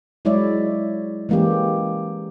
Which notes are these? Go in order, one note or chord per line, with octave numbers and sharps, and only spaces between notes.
F#3 G#3 E4 C#5 D5 E5
E3 G#3 A#3 C#4 G4